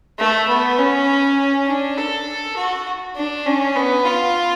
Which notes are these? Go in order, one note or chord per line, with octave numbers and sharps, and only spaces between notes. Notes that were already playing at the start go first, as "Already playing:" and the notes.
A3
B3
C#4
D4
A4
F#4
D4
C#4
B3
F4